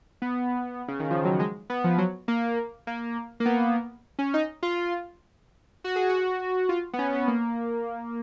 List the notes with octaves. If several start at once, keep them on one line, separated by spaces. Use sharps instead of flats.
B3
C#3
D#3
F3
F#3
G#3
B3
F3
F#3
A#3
A#3
A#3
B3
C#4
D#4
F4
F#4
G#4
F#4
F4
B3
C#4
B3
A#3